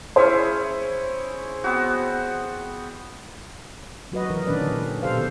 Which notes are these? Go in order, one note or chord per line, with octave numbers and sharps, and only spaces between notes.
C#4 E4 G#4 C5
B3 C4 F#4
F#3 F#4 B4 D#5
E3 A#4
A#2 D#3 C#4 D4 B4 D5
D3
B2 D#3 G4 A4 C5 F5